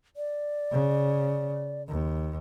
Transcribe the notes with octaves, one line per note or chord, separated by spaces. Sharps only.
D5
C#3
D#2